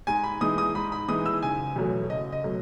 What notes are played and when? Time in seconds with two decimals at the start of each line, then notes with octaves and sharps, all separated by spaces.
0.07 G#2 G#5
0.24 B5
0.41 E3 G#3 D#4 D#6
0.58 D#6
0.75 G#2 B5
0.92 B5
1.08 E3 G#3 D#4 D#6
1.26 E6
1.43 F#1 G#5
1.76 E2 B2 F#3 A3
2.10 F#1 D#5
2.32 D#5
2.44 B2 F#3 A3